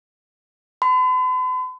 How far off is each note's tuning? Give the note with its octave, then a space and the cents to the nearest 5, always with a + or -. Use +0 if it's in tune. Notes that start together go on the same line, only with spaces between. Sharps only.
B5 +45